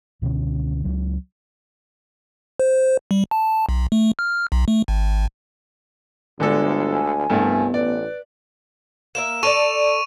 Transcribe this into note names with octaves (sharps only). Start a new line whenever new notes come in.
C#2 B2 D3 C#4
C#2 F#3
C5
G3
A5
B1
A3
F6
B1
A3
G#1
G1 D2 D3 G#3 A4
G#5
C2 G2 A3 B3
A1 B4 D5
A#3 A#4 E5 E7
A4 C#5 D5 C#6 D#7 F7